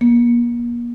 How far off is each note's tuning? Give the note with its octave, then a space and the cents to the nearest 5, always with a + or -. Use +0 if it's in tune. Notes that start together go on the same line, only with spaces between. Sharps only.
A#3 +40